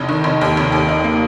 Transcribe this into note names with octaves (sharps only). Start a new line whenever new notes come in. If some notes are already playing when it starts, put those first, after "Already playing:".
Already playing: F1 D#4
D#3
F1
D#2
F1
D#2
D#4
A#3